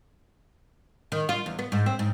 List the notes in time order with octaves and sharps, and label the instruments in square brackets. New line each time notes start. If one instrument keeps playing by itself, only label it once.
[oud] D#3
F4
E2
B3
G#2
C4
G#2